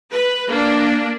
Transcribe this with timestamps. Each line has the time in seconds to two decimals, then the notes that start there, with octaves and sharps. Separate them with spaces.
0.12 B4
0.48 A#3 D4